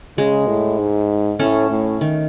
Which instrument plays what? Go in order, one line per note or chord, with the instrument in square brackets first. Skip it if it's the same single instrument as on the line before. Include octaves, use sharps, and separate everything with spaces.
[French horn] C#3 [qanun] G#3
[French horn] A2
G#2
[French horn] A2 [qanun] A3 C#4
[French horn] A2
[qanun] D#3